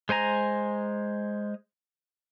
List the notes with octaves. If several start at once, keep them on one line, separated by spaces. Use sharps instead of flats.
G#3 C5 G#5 A#5